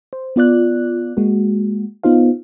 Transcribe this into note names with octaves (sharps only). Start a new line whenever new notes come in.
C5
B3 F4 D5 F#6
G#3 A#3 F#4
B3 D#4 F4 C5 F5